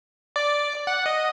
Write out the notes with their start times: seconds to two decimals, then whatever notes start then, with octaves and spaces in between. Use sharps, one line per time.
0.36 D5
0.87 F#5
1.06 D#5